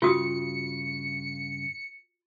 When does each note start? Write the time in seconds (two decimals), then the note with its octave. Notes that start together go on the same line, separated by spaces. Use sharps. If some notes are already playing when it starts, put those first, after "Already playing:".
0.02 G2 C#3 F4 F#4 D#6 C#7